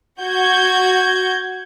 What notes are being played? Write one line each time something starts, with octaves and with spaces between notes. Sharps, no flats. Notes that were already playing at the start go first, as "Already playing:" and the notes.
F#4 G6 G#6